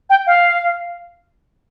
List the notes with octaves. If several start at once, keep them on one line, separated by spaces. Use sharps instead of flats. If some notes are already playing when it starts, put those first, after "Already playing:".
G5
F5